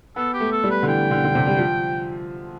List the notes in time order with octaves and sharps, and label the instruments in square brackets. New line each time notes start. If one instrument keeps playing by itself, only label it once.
[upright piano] B3 [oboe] A4
[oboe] G4
[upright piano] A3
[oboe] A4
[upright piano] G3
[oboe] B4
[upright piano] D3
[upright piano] E3 [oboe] G5
[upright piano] D3
D3
C3
G3
F3